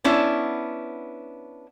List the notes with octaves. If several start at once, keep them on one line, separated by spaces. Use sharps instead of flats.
B3 C#4 D4 E4